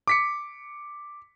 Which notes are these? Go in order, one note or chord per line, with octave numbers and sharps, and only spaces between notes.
D6 B6 C#7